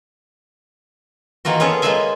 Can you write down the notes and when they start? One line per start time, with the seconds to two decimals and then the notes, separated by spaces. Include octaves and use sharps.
1.45 D#3 E3 A#3 F4 F#4
1.60 B3 C#4 F4 G#4 A4 C#5
1.82 G#3 A#3 F4 B4 E5 G#5